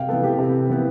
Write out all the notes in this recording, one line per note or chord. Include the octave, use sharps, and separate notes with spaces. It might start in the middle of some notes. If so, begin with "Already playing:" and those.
Already playing: C3 F5 G5
E3 B3 A4
G4
C3
E3 B3